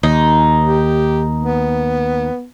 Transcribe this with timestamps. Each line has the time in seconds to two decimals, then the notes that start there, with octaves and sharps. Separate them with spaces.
0.03 D#2 D#4
0.65 G4
1.41 B3